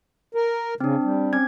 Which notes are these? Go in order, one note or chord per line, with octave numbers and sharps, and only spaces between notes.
A#4
C#3 C4 D4
G3
C4 C#4 G#6